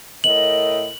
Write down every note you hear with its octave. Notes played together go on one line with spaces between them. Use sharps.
A2 A#4 D#5 F#7